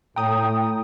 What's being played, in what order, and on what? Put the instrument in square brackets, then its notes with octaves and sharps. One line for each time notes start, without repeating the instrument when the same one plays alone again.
[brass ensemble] A2 [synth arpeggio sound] G5 A#5 D#6